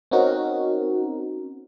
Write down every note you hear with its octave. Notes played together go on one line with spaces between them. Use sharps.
C4 C#4 D#4 F#4 A#4